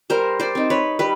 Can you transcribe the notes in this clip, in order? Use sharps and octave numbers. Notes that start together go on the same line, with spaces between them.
G3 A#4 C5
C5 D5
C4 D#4
B4 C#5
G3 B4